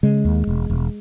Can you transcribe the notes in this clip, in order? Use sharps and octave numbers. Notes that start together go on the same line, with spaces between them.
C#3 G#3
D#2
E1
E1